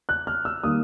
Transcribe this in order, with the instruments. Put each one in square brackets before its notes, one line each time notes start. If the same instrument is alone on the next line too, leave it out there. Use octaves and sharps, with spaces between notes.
[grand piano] F#6
F6
E6
D#3 G3 A#3 D#6